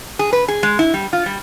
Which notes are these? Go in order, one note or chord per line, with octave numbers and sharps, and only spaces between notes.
G#4
B4
G#4
G#3
E4
G3
F4
G3